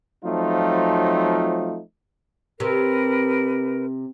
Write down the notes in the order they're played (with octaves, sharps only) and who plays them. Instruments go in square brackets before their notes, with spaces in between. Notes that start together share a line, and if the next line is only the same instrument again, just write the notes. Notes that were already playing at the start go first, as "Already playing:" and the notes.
[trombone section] F3 F#3 A3 C4 D#4 F4
[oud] C3 [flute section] A#4 B4